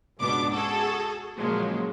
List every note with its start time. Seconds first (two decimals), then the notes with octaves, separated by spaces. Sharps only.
0.20 C#2 G#2 B2 B3 D4 D6
0.53 F#4 G#4 A4
1.37 A#2 C#3 F3 F#3 G#3 A#3